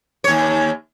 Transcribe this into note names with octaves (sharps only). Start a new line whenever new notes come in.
D#2 C#5